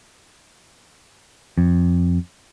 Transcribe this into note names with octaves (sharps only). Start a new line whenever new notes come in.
F2